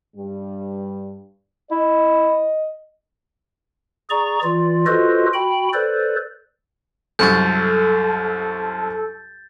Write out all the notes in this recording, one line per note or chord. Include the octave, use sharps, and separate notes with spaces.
G2 G3
E4 D#5
G#4 D5 A#5 C#6
E3 F4 D5
F4 F#4 A4 B4 C5 D#5
F#4 G5 B5
A4 B4 C5 D5
C2 F#2 A4 C#6 G6 A6